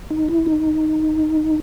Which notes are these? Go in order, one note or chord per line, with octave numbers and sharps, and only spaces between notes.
D#4
E4
D#4